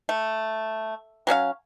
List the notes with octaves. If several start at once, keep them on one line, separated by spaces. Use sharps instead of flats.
A3
F#3 C#4 A4 F5